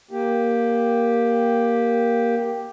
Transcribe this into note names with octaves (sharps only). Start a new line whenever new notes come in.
A#3 G4